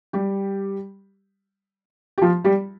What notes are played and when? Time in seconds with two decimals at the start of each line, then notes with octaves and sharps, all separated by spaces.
0.13 G3 G4
2.18 G4
2.22 F3 F4
2.44 G3 G4